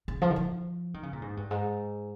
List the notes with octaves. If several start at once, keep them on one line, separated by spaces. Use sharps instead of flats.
C#3
F3
D#3
F3
D#3
C#3
A#2
G#2
G2
G#2